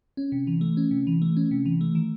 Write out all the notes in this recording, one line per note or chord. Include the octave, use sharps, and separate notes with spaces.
C#4
C3
E3
A3
C#4
C3
E3
A3
C#4
C3
E3
A3
D#3